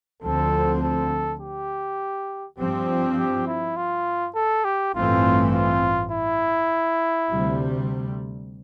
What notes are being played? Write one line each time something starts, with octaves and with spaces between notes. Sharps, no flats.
D2 D3 F3 C4 A4
A4
G4
G2 F3 C4 G4
G4
E4
F4
A4
G4
A1 G2 E3 A3 C4 F4
F4
E4
D2 C3 G3